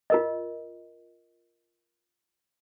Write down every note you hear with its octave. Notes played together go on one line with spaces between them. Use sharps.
F4 A#4 D#5